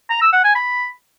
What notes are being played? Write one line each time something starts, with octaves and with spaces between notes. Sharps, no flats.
A#5
E6
F#5
G#5
B5